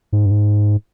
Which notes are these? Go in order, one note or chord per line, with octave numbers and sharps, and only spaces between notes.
G#2
G2
G#2